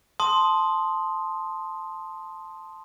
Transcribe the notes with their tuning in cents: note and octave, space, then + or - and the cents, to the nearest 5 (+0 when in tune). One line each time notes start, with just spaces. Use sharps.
A5 +0 C6 +0 D#6 +0